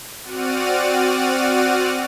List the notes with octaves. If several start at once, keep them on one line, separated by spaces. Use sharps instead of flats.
C4 F#4 D5 F#5 F6 D#7